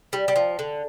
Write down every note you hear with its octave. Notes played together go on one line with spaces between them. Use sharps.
G3
G3
F3
D3